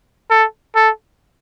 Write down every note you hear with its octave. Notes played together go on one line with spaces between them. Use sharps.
A4
A4